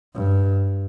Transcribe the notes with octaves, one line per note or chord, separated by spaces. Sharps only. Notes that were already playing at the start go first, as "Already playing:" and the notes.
G2